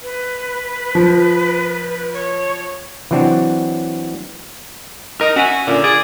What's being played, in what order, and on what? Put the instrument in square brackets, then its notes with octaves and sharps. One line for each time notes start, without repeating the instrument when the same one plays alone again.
[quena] B4
[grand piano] F3
[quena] C#5
[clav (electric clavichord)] E3 F#3 C4 D4 F#4 C#5
[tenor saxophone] D#4 [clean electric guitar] A#4
[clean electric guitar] C#4 E5 G#5 [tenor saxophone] F#4
[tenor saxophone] A#2 [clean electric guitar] D3
[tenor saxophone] G#4 [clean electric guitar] D5